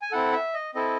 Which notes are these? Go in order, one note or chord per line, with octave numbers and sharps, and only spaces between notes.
G#5
C4 E4 A4 F#5
E5
D#5
C4 E4 A4 D#5